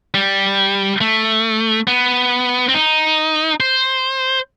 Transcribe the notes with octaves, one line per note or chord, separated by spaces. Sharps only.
G3
A3
B3
C4
D#4
C5